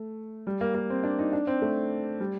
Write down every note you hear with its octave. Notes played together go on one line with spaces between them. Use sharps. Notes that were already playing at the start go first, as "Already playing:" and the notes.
Already playing: A3
G3
A#3
A#3
C4
D4
D#4
D4
C4
A3
G3